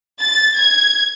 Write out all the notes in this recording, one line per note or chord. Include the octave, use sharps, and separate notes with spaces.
A6
G#6